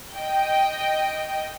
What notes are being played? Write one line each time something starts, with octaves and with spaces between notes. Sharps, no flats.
D#5 G5